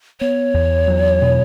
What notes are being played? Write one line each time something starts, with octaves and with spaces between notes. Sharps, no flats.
B3 C#5
E2
F#3
B2